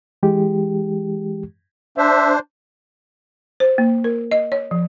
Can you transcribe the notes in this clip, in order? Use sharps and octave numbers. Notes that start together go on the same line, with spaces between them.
E3 G#3 G4
D4 C5 E5
C5
A#3
A#4
D#5
C#5
F3